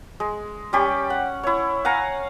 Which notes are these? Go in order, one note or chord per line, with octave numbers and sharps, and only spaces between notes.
G#3
G3 C#4 G4
F#5
E4 C#5
F5 F#5 G#5 A#5